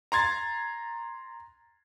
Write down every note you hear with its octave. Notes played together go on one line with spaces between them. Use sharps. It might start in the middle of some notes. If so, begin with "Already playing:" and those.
A#5 C6 G#6 A6